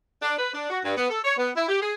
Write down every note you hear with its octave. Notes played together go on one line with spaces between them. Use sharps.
D4
B4
D4
F#4
G2
B3
A4
C#5
B3
E4
G4
G#4